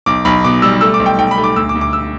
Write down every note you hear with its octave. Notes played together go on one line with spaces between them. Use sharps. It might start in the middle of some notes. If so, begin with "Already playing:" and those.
B1 D6
B1 B5
B2 D6
G3 E6
A3 E6
D6
B1
G5
B1 G5
B5
A3
D6
D2 E6
D6
D2
D6
E6